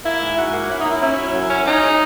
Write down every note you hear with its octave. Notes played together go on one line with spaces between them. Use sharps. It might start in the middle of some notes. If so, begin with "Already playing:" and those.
A#3 E4
G#2
G#2 F#4
A#3
C#4 E4
D#4
A#3
E4
C#4 E4
F#3
F#2
C#4
C#4 D#4
G#3